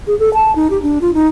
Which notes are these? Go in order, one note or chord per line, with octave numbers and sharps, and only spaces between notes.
G#4
A4
A5
D#4
G4
D4
F4
D#4